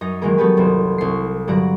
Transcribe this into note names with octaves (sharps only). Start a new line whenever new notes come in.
F#2 D#4 A#6
D#3 E3 F#3 G#3 A#3 A#4
F#3 A3 B3 G4 B4
F#1 C2 C5
C2 C7
G2 D3 F#3 D5 F#5 A#5